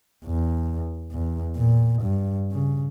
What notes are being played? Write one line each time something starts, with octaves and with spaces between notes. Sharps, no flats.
E2
E2
A#2
G2
C#3